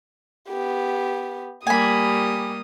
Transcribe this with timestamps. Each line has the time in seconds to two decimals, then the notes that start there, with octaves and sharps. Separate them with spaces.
0.49 B3 G4
1.67 G3 A#3 G4 G#5 B5 D#6